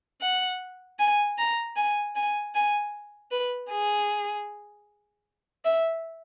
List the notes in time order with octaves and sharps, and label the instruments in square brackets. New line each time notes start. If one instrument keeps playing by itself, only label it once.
[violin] F#5
G#5
A#5
G#5
G#5
G#5
B4
G#4
E5